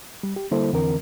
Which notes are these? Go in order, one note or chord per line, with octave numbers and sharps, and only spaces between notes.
G3
G4
D3 G3 A#3 E4 A4 C5
F2 D3 E3 C4 A#4